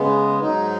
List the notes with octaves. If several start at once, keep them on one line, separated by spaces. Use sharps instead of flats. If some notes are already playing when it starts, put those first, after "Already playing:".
Already playing: C#3 G#3 B3
G#2 F#3 D#4